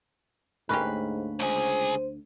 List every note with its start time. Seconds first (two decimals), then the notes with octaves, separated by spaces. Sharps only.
0.69 D2 G#2 A#3 C#4 G4 B4
1.40 C#2 G#4 C5